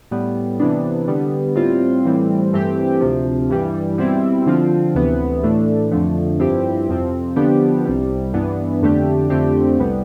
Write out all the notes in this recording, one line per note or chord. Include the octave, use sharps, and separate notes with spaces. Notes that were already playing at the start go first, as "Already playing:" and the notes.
A2 G3 B3
C3 E3 B3 D4
D3 G3 B3
A2 G3 C4 F4
A2 E3 G3 C4
G2 E3 A3 C4 G4
D2 C3 F3
G2 E3 G3
B2 G3 C4 E4
D3 F3 C4 F4
D2 C3 E3 B3
A2 E3 A3 D4
F2 D3 F3 A3
G2 F3 C4 E4 G4
F2 C3 F3 C4
D3 F3 B3 D4 G4
C2 C3 G3
G2 E3 B3 D4
F2 D3 A3 D4 G4
F2 D3 A3 C4 G4
C2 C3 G3 B3